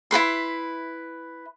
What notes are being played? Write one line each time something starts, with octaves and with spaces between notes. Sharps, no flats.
E4 G#4 B4 C6